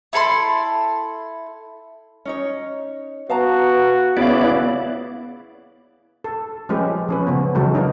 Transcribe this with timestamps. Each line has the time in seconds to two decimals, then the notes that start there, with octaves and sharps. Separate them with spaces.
0.13 E4 A4 B5 C6
2.25 C#4 D#4 C#5
3.30 B3 F#4 F5 A5 A#5
4.17 C#3 B3 E4 B4 D5 F5
6.24 A4
6.69 F3 G#3 C#4 G4 B4
7.09 F3 C#4 B4
7.27 C#3 B3
7.55 C#3 E3 F#3 G#3 F#4 A4
7.74 D4 D#4 F4 A#4